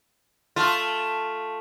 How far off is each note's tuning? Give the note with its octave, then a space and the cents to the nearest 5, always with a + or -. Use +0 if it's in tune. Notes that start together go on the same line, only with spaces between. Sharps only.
A3 +0 F4 +0